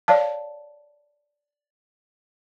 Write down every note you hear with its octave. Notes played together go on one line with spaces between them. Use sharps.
C#5 D5 F5 A5